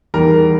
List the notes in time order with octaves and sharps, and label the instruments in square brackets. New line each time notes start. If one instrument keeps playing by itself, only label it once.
[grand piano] E2 D#3 G3 A#4